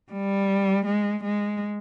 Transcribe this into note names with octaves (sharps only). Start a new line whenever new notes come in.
G3
G#3
G#3